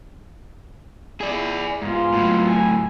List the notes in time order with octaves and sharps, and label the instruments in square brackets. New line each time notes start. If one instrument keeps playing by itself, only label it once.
[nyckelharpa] E4 [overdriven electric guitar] G#4 D5
[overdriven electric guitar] G#2 [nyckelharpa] B3 F4
[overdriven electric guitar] A2 F#3
[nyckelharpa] G#5